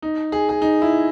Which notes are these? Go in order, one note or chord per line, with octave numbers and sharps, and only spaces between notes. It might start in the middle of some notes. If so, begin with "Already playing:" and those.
D#4
G#4
G#4
D#4
E4